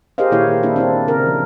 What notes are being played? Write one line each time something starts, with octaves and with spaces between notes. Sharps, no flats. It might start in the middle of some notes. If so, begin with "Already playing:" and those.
G4 G#4 A#4 C5 D#5 F5
A#2 D#3 A#3 E4 C#5 F5
A#3 D4 E4
C4 D4 E4 A#4
C#3 A#4
F3